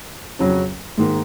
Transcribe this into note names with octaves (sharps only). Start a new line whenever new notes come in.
F2 C#3 F#3 C#4
G#2 D#3 A#3